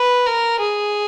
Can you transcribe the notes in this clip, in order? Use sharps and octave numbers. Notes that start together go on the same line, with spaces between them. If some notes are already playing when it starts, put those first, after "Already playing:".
Already playing: B4
A#4
G#4